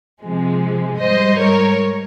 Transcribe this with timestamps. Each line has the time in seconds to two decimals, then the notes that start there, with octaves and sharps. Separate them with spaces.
0.22 C3 F3 G#3
0.99 G#2 G3 C5 D#5
1.39 A#4 C#5